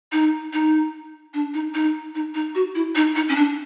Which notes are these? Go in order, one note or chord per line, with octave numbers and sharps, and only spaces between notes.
D#4
D#4
D4
D#4
D#4
D#4
D#4
F#4
E4
D#4
D#4
C#4
D4